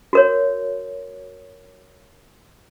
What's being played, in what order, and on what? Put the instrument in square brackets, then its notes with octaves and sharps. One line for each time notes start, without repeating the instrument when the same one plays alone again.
[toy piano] F#4 A#4 C#5